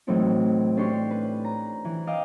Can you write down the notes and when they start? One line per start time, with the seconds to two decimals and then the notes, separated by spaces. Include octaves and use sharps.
0.07 A2 E3 F#3 C4 D#4 E4
0.77 C#4 D4 G4 C#5 C6 C#6
1.11 B4
1.44 A#5
1.85 E3
2.07 D#5 F5 G5 D6 F6